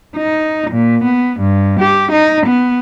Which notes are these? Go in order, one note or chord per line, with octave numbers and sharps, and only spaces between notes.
D#4
A#2
B3
G2
G4
D#4
B3